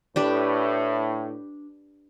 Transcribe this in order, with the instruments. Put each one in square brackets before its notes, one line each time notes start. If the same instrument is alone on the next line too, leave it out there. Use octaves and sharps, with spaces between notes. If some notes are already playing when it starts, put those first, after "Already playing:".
[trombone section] A2 [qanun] D4 G4 B4